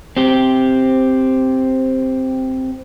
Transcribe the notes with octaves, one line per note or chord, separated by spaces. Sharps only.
C4 G4